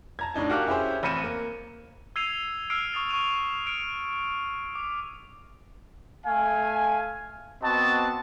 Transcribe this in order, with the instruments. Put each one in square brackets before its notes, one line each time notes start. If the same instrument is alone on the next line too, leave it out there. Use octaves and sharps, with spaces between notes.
[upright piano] A5 A#5 G#6
A2 D4 D#4 A5
F#4 G4 A#4 F5 D6 F#6
C#4 E4 G4 G#4 C5
A1 C4 B5 C#7 D#7 E7
A#3
[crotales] E6 G#6 C7 D#7 F7
E6 F6 C7 D7
C#6 D#6 A6 F7
C#6 F6 D#7 F7
F6 C#7 D7
D6
[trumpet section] A3 F5 G#5
B3 C4 F#4 D#5 A5